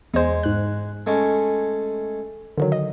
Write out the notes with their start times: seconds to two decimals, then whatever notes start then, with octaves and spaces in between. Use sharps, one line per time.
0.14 E2 G#3 D#4 C5
0.43 G#2 F#6
1.07 G#3 A3 C#4
2.58 D3 D#3 F#3
2.72 D#5